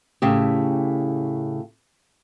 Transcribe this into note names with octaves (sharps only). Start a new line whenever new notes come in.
A2 C#3 G4